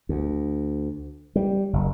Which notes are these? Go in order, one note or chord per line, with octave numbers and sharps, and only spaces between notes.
D2
G3
F#1